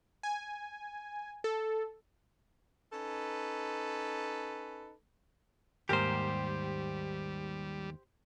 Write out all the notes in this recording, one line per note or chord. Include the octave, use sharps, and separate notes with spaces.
G#5
A4
C#4 D#4 A4 B4
D#2 G#2 G3 G4 A#4 C5